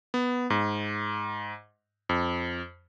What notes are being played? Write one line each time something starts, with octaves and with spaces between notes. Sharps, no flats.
B3
G#2
F2